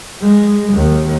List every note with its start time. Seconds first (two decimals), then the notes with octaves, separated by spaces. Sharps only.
0.22 G#3
0.73 D#2